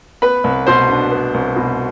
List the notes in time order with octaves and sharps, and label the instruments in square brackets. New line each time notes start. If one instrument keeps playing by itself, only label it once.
[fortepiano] B3 B4 B5
C2
B2 C5 C6
D4
B3
C2
B2